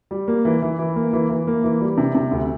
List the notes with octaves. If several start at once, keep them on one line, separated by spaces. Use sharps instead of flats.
G3
A#3
E3
E3
E3
A#3
E3
E3
A#3
E3
G3
C3
C3
D2